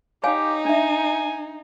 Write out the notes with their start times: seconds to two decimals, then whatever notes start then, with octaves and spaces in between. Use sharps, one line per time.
0.24 D#4 G4 C#5 F5 G#5
0.65 D4 E5 G#5